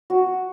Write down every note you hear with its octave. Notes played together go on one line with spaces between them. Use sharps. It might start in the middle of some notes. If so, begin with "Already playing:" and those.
F#4